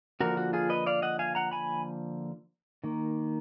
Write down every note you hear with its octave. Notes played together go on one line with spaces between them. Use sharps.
D3 F3 A#3 F#4 A#4
F#4
F4 G#4
B4 D#5
D5 F5
D#5 F#5
F5 G#5
F#5 A#5
G#5 B5
D#3 A#3